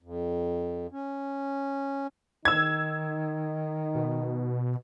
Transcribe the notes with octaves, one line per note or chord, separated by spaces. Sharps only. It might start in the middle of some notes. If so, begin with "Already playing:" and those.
F2
C#4
D#3 D#4 E6 G#6
B2